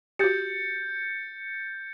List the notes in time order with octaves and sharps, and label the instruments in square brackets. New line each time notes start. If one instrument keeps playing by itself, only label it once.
[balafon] F#4 G4 [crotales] G6 A6 C#7